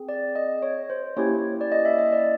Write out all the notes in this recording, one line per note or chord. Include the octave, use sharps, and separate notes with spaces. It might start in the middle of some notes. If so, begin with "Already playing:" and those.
Already playing: C4 G#4
D5
D#5
C#5
C5
A#3 C#4 E4 G4 C#5
D5
D#5
E5
D#5
D5